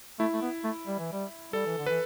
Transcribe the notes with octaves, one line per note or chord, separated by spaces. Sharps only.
A3 E4
A3
B3
A3
G3
E3
G3
G3 A4
E3
D3
E3 B4